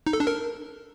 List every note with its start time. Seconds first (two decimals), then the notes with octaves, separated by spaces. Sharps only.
0.07 D#4
0.13 A4
0.20 D4
0.27 A#4